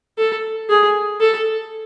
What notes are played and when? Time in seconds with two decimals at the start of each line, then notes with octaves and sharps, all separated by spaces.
0.18 A4
0.70 G#4
1.20 A4